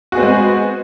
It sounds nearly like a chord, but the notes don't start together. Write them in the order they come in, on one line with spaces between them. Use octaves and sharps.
F#4 G#4 B3 C4 G#3